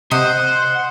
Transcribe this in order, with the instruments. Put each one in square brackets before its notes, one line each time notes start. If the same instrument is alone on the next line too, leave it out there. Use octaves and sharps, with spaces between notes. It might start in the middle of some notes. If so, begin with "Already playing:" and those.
[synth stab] C3 [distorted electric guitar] C5 [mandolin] D#5 [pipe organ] F#5